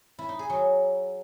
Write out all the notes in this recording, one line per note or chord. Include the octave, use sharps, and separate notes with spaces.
E4
D#4
G#4
F#3